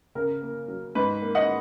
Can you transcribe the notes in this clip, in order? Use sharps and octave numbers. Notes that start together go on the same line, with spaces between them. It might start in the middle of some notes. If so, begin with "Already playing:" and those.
C#3 A#4
A#3
F#3
G#2 B4
A#3
D#5 F#5